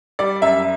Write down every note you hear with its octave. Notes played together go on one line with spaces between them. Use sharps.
G3 D5
F#2 E5